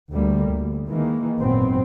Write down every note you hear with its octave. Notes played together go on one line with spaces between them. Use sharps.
D2 G3 A3 A#3
D2
D#3 E3 G#3 A#3
G#1 F#2 A#2 B3 C4